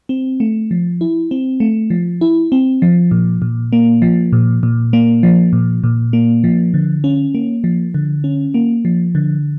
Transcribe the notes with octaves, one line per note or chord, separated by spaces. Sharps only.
C4
A3
F3
E4
C4
A3
F3
E4
C4
F3
A#2
A#2
A#3
F3
A#2
A#2
A#3
F3
A#2
A#2
A#3
F3
D3
C#4
A#3
F3
D3
C#4
A#3
F3
D3